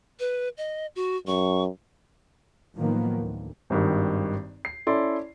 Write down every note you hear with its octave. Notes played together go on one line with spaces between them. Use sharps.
B4
D#5
F#4
F#2 C#6
A2 D#3 F3 F#3 A#3 B3
D2
G#1 G2 D#3
C7
C#4 E4 A4 D5 C6